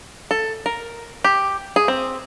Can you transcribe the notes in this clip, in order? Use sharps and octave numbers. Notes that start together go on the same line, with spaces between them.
A4
A#4
G4
G#4
C4